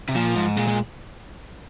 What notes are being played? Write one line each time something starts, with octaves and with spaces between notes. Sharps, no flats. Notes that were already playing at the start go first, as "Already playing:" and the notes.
C3
A#2 F3
G#2
A#2 G#3
G#3